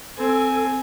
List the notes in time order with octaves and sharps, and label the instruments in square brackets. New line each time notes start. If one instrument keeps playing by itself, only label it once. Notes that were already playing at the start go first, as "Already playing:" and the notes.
[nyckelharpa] C4 G#5 [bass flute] A4